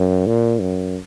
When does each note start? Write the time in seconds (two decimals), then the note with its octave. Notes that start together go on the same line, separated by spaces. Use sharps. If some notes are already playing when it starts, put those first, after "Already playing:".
Already playing: F#2
0.26 A#2
0.61 F#2